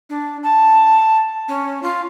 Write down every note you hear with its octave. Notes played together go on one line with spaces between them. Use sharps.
D4
A5
C#4
F4